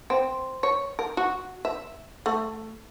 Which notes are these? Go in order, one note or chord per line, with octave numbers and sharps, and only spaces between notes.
C4
C#5
A#4
F#4
E5
A3